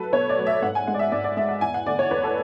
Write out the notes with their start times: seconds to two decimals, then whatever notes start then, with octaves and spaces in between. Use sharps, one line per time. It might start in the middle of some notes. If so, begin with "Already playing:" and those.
Already playing: F#3 A3 A4 B4
0.12 B2 C#5
0.29 D5
0.37 F#3 A3
0.46 E5
0.62 G#2 F#5
0.75 G#5
0.87 G#3 F#5
0.94 D5
0.99 E5
1.12 G#2 D5
1.24 D5
1.37 G#3 E5
1.49 F#5
1.61 E2 G#5
1.74 F#5
1.86 D3 A3 D5
1.99 C#5
2.11 E2 B4
2.24 A4